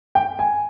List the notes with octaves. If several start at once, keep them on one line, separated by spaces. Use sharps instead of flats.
G5
G#5